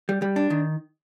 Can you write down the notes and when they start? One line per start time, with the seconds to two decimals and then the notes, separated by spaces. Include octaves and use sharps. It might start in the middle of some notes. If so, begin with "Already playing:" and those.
0.09 G3
0.22 G3
0.36 D4
0.50 D#3